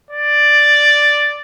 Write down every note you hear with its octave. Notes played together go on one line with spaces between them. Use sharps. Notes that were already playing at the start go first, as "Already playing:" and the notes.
D5